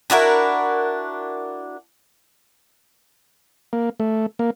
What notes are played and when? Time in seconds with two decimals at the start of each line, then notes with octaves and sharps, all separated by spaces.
0.10 D4 E4 F#4 A#4
3.73 A#3
4.00 A3
4.39 A#3